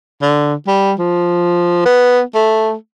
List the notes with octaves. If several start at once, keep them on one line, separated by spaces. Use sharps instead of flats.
D3
G3
F3
B3
A3